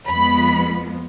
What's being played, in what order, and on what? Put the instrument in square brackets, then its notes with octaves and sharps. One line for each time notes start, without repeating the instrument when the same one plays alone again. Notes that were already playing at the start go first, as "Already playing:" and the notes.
[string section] F2 F3 G#3 B3 B5